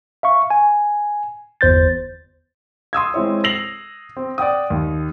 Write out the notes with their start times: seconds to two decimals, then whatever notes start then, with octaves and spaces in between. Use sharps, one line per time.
0.23 E5 F5 C#6
0.50 G#5
1.61 G1 E2 C5 G6 A6
2.93 C6 D#6 E6 G#6
3.14 G#3 C4 E4 C#5
3.44 E6 A#6 C7 F7 F#7
4.17 C4
4.38 D5 F#5 G5 D#6
4.70 D#2